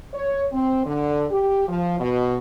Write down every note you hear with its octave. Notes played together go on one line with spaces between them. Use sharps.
C#5
C4
D3
G4
F3
B2